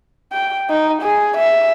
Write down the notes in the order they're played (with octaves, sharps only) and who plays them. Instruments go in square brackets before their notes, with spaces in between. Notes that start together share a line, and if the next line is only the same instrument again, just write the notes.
[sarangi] G5
D#4
G#4
E5